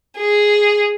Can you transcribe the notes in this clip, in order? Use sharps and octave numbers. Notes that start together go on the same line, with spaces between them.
G#4